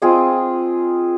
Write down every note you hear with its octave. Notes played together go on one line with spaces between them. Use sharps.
C4 F4 G#4 D#5